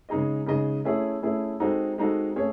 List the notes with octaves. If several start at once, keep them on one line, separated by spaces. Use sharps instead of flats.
C#3 G#3 D#4 G#4 D#5
C#3 G#3 D#4 G#4 D#5
A3 C#4 E4 G#4
A3 C#4 E4 G#4
G#3 C4 D#4 F#4 A4
G#3 C4 D#4 F#4 A4
A3 C#4 G#4 C#5